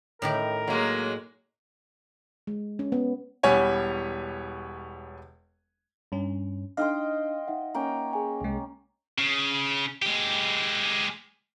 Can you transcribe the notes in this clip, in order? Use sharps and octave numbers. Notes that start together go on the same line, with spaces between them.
A2 D#3 G4 A#4
F#3 G#3 A#3
G#3
C#4
B3
E1 G3 B3 C#5 G#5
G2 C#4
D4 D#4 D#5 F5 G5 C6 F6
D#4 E5 F#5
A#3 C#4 G5
G#4 G#5
C2 G#3
C#3
G#3 G4